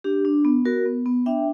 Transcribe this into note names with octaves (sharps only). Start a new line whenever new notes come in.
D4 G4
D4
B3
F#4 A#4
B3
B3
D4 E5 G5